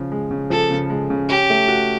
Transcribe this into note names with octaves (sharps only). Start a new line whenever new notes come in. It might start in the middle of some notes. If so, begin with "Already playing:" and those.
Already playing: C#3 F3
G#3
C#3
F3 A4
C#3
G#3
C#3
C#4 G4
A3
F#4